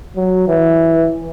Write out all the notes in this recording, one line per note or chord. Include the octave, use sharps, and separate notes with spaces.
F#3
E3